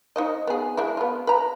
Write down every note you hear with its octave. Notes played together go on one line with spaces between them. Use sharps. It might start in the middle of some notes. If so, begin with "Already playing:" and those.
D#4 C5 D#5
B3 G#4
G#3 D4 E4
B3 F4
B4 A#5